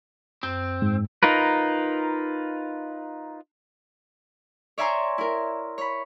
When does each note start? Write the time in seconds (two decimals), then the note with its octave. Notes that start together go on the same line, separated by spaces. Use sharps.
0.43 F#2 C4
0.82 G#2
1.23 D#4 F4 A#4 B4
4.78 C#5 D5 E5 G#5 A#5 C6
5.18 E4 A#4
5.78 C#5 B5